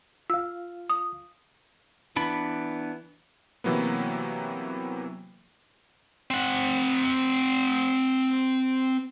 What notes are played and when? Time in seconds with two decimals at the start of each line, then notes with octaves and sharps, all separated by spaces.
0.30 F4 F5 E6
0.90 D#6
2.16 E3 B3 D4 B5
3.64 C3 E3 F#3 A#3 B3
6.31 C4 F#5